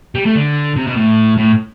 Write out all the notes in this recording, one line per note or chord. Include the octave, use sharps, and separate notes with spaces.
G3
A3
D3
C3
B2
A2
A2